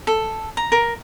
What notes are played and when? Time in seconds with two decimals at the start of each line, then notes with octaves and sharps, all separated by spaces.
0.07 A4
0.57 A#5
0.72 A#4